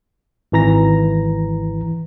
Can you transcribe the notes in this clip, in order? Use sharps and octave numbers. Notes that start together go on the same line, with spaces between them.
G#1 E3 A#5 A#6